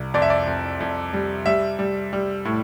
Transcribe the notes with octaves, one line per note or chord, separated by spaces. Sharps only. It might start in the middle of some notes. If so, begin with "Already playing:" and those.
Already playing: C2
F2 D5
E5
D5
F2
F2
G3
G3 E5
G3
G3
A2